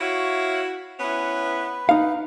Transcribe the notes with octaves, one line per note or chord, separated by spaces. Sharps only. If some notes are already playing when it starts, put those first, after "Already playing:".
E4 F#4 C#5 E5 F5
B3 C#4 E4 B4
D#4 F5